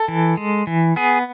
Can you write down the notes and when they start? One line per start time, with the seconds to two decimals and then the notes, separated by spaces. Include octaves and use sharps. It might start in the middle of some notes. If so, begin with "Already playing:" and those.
Already playing: A4
0.08 E3
0.37 G#3
0.67 E3
0.96 B3 G#4